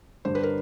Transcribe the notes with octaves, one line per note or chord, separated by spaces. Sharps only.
G2 D3 G3 C5
B4
A#4